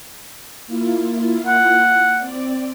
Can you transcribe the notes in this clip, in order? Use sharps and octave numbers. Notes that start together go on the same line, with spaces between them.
A#3 E4 F4
F#5
C4 D5